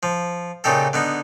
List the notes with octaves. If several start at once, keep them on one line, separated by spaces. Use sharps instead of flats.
F3
A#2 C#3 D#4 G4 A4
D3 B3 D#4